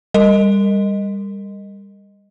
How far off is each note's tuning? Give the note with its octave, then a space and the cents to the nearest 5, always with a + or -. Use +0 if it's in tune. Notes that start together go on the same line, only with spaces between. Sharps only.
G3 +25 A#4 -30 D#5 +0